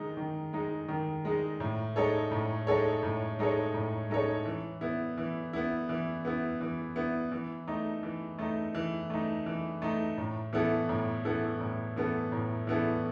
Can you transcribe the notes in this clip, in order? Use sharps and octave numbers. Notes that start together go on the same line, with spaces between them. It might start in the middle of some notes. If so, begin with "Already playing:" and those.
Already playing: D#3 G#3 D#4
D#3
G#3 D#4
D#3
G#3 D#4
A2
G#3 D#4 A4 C#5
A2
G#3 D#4 A4 C#5
A2
G#3 D#4 A4 C#5
A2
G#3 D#4 A4 C#5
E3
B3 E4
E3
B3 E4
E3
B3 E4
E3
B3 E4
E3
A3 D#4
E3
A3 D#4
E3
A3 D#4
E3
A3 D#4
A2
E3 B3 E4 A4
A2
E3 B3 E4 A4
A2
E3 B3 E4 A4
A2
E3 B3 E4 A4